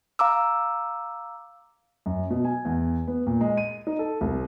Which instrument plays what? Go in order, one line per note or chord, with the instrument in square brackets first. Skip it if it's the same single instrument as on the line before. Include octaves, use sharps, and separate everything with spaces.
[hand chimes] F5 A#5 D6 E6
[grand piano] F#2
B2
G#5
E2
B3
A#2
G#3
D#7
D#4
A4
C2